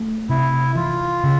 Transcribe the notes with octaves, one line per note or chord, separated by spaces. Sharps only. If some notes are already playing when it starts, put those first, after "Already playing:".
Already playing: A3
C3 E4
E3 F4
C#3